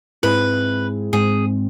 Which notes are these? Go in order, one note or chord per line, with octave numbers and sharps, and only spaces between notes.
G#2 G#3 C4 E4 G#4 B4
G#2 G#3 C4 G#4